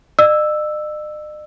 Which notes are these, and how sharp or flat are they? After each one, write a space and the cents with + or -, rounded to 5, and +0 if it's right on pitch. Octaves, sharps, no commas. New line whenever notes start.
D#5 -45 E6 +0